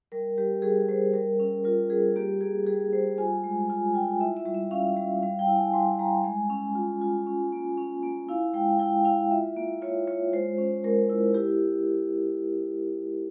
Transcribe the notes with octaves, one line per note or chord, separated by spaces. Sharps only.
G3 A#4
G3 G4
G3 G#4
G3 C5
G3 A#4
C#4
F4 A#4
G3 G#4
A#3 G4
A#3 G#4
G3 G#4
G3 C5
F4 G#5
G#3
F4 G#5
F4 G5
E4 E5
E5
G3
E5
C#4 F5
G3
G3 F5
G5
E4
G#5
G3 C6
G3 A#5
G#3 G#5
C#4
F4
F4
C#4
A#3
C#4
A#3
E4 F5
G#3 G5
F5
E4 G5
E4 F5
F4 E5
A#3
F4 C#5
F4 C#5
G#3 C5
C#4
G#3 A#4
E4
E4 G4